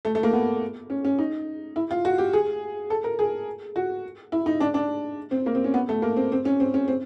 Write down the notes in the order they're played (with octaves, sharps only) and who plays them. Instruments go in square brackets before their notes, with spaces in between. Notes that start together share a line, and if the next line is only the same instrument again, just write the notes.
[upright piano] A3
A3
A#3
B3
C#4
C#4
D#4
E4
F4
F#4
G4
G#4
A4
A#4
G#4
F#4
E4
D#4
D4
D4
C4
A#3
C4
C#4
B3
A3
A#3
C4
C4
C#4
C4
C#4
C4